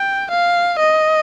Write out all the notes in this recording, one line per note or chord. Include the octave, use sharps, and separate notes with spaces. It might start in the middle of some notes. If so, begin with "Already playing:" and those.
Already playing: G5
F5
D#5